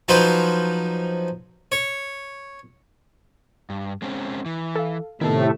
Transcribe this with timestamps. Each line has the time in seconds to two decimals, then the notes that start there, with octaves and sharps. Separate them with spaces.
0.08 F3 F#3 D#4 F4 B4 C5
1.72 C#5
3.70 G2
4.02 G#3 C4 C#4
4.46 E3
4.75 A4 F5
5.21 A2 C3 D#3 A3 B3 E4 A4 A5